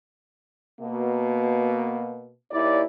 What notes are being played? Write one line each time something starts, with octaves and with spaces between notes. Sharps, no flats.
B2 A#3
D#2 E4 D5